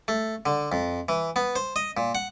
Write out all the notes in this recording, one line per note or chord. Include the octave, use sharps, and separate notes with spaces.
A3
D3
F2
E3
B3
C5
D#5
A#2
F#5